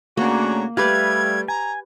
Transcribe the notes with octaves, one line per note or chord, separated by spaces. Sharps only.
C#3 A3 A#3 D4 F#4 C#5 A#5
G3 A3 G4 B4 D5 F5 G#6
G#5 A#5